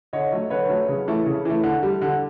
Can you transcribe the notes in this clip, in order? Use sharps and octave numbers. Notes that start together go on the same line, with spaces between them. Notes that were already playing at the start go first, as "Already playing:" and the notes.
D3 C#5 D#5
F#3 A3
D3 B4 C#5
F#3 A3
C#3
E3 A3
C#3
E3 A3
D3
G3
D3